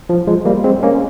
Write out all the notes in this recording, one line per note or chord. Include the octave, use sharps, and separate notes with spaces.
F3
F3 G#3
G3 A#3
G#3 C4
A#3 C#4